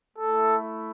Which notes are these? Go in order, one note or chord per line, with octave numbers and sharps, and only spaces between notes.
A3 E4 A4